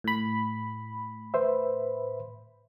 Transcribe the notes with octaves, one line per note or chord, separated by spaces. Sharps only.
A2 B5
B4 C5 E5